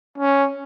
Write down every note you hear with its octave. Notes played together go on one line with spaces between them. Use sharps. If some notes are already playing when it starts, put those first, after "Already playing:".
C#4